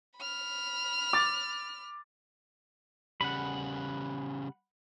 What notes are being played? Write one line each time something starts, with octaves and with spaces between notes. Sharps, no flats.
B5 F6
D6 A6
C#3 G3 F#5 B5